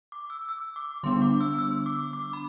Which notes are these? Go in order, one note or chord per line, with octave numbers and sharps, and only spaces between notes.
D6
E6
E6
D6
D3 G3 B3 D4 C6
D6
E6
E6
D6
D6
B5